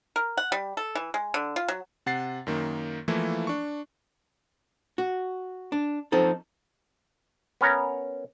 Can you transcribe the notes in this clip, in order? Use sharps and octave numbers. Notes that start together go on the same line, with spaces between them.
A#4
F#5
G3
A4
E3
G#3
D3
F4
F#3
C3 F#5 A6 C7
F#2 D#3 A#3
E3 F3 A3 A#3 E4
D4 C#6
F#4
D4
F3 C4 D#4 A4
B3 C#4 A#4 C#5 A#5